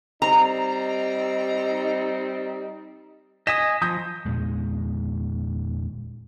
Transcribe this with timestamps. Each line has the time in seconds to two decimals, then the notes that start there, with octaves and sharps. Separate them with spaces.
0.22 G3 C4 D#4 A#5
3.47 D#5 G#5 D#6 B6 E7
3.82 F3 D#6 G6 A#6
4.26 E2 A#2 G#3